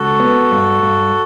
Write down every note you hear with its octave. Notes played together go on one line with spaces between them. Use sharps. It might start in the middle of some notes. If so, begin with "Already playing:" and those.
Already playing: C#2 F#4 A4
B3
G2
G2